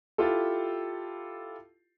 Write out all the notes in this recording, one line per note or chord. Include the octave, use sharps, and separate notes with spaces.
E4 F4 G4 A4